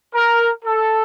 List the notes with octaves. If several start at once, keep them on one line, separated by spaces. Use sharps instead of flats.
A#4
A4